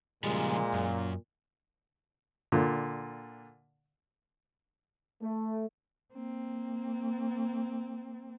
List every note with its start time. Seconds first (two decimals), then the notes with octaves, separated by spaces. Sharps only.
0.24 A#2 C#3 F3 G3 G#3
0.74 F#2
2.52 A#2 D3
5.22 A3
6.14 A#3 C4